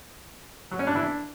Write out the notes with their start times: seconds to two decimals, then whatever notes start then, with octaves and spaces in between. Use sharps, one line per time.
0.71 F#3
0.79 C#4
0.87 D4
0.95 E3
1.03 D4